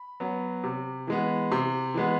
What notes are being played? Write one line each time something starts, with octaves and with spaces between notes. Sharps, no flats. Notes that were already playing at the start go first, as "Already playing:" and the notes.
Already playing: B5
F#3 B3
C3
E3 G#3 B3
C3 C6
E3 G#3 B3